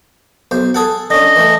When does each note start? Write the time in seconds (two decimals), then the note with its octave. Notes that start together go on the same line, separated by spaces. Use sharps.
0.51 B1 C5
0.74 G#4 A4 F#5
1.10 D3 C#4 D#5
1.36 E3 A3